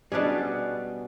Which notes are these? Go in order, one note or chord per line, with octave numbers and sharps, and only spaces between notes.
B2 G3 C#4 D4 G#4 B4 A5